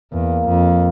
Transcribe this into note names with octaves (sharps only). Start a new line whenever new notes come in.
E2 A#3
F2